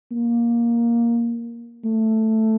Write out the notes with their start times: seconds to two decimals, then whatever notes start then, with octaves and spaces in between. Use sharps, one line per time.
0.11 A#3
1.85 A3